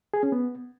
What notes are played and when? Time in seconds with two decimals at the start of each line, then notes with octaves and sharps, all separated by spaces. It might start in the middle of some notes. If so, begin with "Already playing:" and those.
0.14 G#4
0.23 C#4
0.32 B3